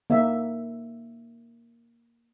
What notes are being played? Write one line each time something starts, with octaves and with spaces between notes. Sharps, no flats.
A#3 E5